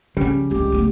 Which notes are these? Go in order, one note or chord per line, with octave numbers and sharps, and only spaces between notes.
C#3 F3 G3 C#4
C#2 D#3 G4
A3 B3